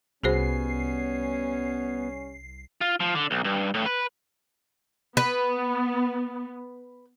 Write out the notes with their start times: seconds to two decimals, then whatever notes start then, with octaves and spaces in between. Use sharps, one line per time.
0.24 C2 G3 B3 C#4 F#4 G#4 C5 C7
2.81 F4
3.00 F3
3.15 D3
3.31 B1
3.44 G2
3.74 A2
3.86 B4
5.17 B3 B4